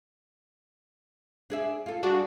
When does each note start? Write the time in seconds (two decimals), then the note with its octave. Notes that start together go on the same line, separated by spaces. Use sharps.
1.50 D4 G#4 E5
1.86 F4 A4
2.03 G3 D4 F#4 G#4